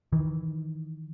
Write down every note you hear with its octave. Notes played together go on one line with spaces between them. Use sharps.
D#3 E3